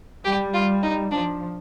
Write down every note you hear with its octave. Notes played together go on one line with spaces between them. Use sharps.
G3 G4
F4
D#4
F3 D4